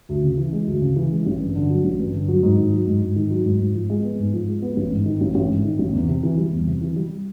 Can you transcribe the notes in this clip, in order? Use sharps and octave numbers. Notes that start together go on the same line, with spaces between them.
D2
C#3
E3
G#3
D2
C#3
E3
G#3
A1
G2
D3
F#3
A1
G2
D3
F#3
G#2
D#3
F#3
G#2
G#2
D#3
F#3
G#2
G#2
F3
G#3
B3
G#2
F3
G#3
B3
A1
G#2
D#3
A1
A1
G#2
D#3
A1
E2
C3
E3
G3
E2
C3
E3
G3